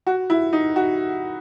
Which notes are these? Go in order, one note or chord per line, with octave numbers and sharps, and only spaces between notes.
F#4
E4
D#4
F#4